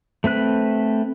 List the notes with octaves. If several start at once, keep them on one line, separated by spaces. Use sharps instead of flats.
A3 C4 B4 F#6